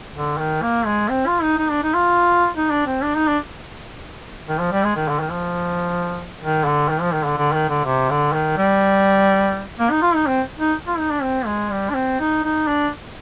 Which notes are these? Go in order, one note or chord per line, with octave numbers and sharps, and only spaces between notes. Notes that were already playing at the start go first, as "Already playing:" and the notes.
D3
D#3
A#3
G#3
C4
F4
D#4
D#4
D4
D#4
F4
D#4
D4
C4
D4
D#4
D4
D#3
F3
G3
G#3
D#3
D3
D#3
F3
D#3
D3
D#3
F3
D#3
D3
D3
D#3
D3
C3
D3
D#3
G3
A#3
D#4
F4
D#4
C4
D#4
F4
D#4
D4
C4
G#3
G3
D4
C4
D#4
D#4
D4